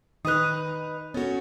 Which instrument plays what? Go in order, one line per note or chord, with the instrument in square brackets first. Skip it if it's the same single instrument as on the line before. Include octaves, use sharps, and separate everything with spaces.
[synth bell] D#3 D#7 F7 [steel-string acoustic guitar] D#4 B4 [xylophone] D#6 F#6
[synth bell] B3 A4 [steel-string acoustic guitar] C#4 F#4